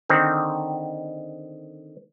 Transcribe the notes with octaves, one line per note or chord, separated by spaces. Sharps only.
D3 D#3 C4